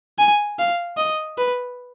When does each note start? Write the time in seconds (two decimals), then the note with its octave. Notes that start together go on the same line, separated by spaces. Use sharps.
0.19 G#5
0.59 F5
0.97 D#5
1.38 B4